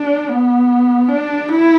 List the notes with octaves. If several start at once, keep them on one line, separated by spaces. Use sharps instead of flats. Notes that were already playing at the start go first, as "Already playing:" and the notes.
Already playing: D4
B3
D4
E4